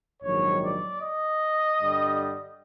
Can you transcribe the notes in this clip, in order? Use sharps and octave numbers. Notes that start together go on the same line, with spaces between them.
A#1 G#2 D#3 F#3 C#5
D5
D#5
G2 D3 G3